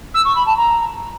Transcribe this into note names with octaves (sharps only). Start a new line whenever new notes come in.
E6
C#6
B5
A5
A#5